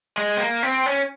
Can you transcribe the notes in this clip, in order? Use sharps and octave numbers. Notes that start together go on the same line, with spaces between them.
G#3
C4
A#3
C4
C#4